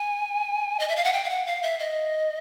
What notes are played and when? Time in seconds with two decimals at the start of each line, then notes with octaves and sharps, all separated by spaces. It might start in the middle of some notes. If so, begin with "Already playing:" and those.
Already playing: G#5
0.80 D#5
0.88 E5
0.96 F5
1.04 F#5
1.13 G5
1.24 F5
1.30 F#5
1.46 F5
1.63 E5
1.80 D#5